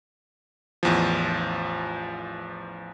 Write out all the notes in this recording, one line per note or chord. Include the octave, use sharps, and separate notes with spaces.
A1 E2 F3